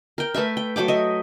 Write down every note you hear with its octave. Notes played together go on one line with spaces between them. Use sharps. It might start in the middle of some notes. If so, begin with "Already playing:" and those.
A#4 G5
A3 A4 B4 E5
G5
F#3 A3 G5 D6
D#5 E5